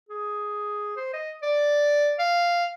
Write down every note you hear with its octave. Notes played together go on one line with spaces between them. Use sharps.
G#4
C5
D#5
D5
F5